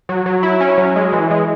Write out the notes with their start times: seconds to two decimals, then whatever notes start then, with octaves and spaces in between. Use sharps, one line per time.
0.09 F#3
0.26 F#3
0.43 E4
0.60 C#4
0.78 F#3
0.96 G#3
1.13 E3
1.31 G#3